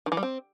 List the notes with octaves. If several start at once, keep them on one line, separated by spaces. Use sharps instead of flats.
D#3
E3
G3
C4